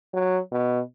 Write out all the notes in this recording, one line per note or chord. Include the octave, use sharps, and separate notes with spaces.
F#3
B2